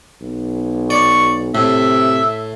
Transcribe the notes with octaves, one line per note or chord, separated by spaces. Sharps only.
B1
D5 C#6
A2 C3 E5